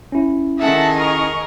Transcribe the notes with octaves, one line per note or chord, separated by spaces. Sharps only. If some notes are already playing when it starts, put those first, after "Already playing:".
C#4 E4
D#3 G#4 A4 E5 F#5 A5
A#4 D#5 C#6